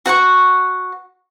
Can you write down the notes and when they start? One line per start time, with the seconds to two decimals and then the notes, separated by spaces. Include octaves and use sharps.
0.06 F#4 F#5 G5 C#6